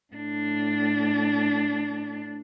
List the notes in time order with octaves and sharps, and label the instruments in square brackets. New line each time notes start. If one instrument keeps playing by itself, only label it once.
[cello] A2 D4